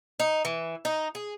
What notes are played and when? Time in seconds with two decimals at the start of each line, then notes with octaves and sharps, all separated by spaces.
0.20 D#4
0.45 E3
0.85 D#4
1.15 G#4